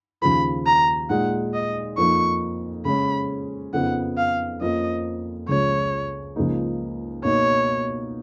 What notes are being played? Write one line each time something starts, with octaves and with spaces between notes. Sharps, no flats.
D#2 C#3 F3 B5
A#5
A#2 G#3 D#4 F#5
D#5
F2 F3 A#3 D#4 C#6
C#3 G#3 C#4 B5
F2 C#3 F3 B3 D#4 F#5
F5
F2 F3 A#3 C#4 D#5
C#2 C#3 F3 G#3 C#5
C#2 C#3 F3 A#3 D#4
B2 A#3 D#4 C#5